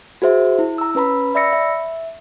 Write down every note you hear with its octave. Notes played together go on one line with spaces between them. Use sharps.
F#4 G#4 C5 E5
E4
A#5 E6
C#4 B4 A#5 B5
D5 E5 B5 E6 A#6 C#7
E5